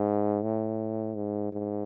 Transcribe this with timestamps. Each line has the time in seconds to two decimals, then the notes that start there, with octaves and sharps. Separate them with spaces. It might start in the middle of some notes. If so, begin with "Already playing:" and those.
Already playing: G#2
0.42 A2
1.16 G#2
1.52 G#2